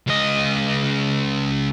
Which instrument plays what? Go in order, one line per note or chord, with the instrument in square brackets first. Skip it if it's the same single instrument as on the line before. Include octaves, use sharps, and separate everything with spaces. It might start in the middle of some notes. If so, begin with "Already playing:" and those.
[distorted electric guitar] C#2 D#5